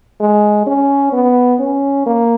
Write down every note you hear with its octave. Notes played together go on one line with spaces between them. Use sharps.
G#3
C#4
B3
C#4
A#3